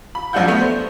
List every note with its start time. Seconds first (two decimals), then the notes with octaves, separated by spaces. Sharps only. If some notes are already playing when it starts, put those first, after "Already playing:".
0.15 B5
0.33 A#1 F#2 F3 D4 F#5 G6
0.48 A3 B3
0.61 C5